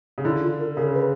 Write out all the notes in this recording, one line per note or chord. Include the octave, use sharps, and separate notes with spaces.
C#3
D3 E4
F4
A#4
C#3 A#4
B4